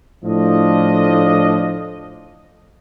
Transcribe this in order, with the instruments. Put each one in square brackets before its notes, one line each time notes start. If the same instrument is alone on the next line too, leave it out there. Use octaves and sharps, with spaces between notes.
[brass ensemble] A2 F3 D4 D#5